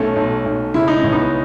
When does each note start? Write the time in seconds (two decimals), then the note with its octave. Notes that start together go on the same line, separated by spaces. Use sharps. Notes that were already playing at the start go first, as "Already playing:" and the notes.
Already playing: B1 A3 C#4
0.16 B1
0.46 B1
0.74 C#3 E4
0.88 D#4
0.99 C#2 C#4
1.12 B3 D#4